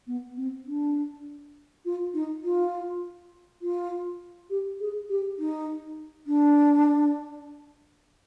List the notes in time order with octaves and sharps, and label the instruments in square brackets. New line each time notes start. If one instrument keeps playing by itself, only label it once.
[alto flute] B3
C4
D4
F4
D#4
F4
F4
G4
G#4
G4
D#4
D4